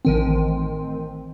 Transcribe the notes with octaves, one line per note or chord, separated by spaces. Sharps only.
A1 D#3 C4